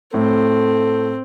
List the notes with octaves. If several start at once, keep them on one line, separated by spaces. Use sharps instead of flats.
A2 C4 A4